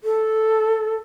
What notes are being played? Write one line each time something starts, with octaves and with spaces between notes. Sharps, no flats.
A4